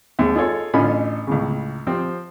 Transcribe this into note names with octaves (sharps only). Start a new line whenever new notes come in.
D#2 G#3
D#4 F4 G#4 A4 C#5
A1 D3 C#4 F4 D#5 B5
C#2 A2 C#3
F3 C4 G4